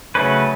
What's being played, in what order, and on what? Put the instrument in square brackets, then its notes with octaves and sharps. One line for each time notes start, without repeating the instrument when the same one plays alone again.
[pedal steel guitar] C#3 F#3 A3 C#4 B4